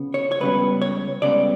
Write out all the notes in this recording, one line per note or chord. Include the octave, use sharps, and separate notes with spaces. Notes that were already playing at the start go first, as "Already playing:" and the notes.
Already playing: C#3 B3
C#5
C#5
C#2 C#3 G3 B3 B4
C#5
C#2 C#3 G3 B3 D5